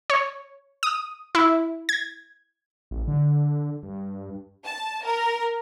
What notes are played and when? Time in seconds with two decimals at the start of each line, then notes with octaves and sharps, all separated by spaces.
0.10 C#5
0.83 D#6
1.35 E4
1.89 G#6
2.91 A1
3.08 D3
3.83 G2
4.65 A5
5.04 A#4